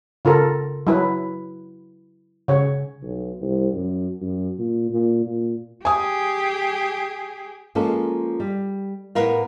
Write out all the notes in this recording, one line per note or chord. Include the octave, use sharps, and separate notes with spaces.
C#3 F4 A4 A#4
F#3 E4 B4
C#3 C#5
B1
C2
F#2
F#2
A#2
A#2
A#2
G4 G#4 G#5 D#6
F3 G#3 A#3 C#4 A4
G3
A2 B3 A#4 F5